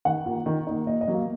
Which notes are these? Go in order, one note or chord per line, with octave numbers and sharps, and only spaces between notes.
D#3 F#5
A#3 F4
D#3
A#3 D#4
A#2 D#5
D#5
F#3 A#3
F5